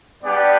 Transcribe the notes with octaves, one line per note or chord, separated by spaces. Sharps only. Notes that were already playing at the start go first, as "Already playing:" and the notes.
G3 B3 D4 G4 D5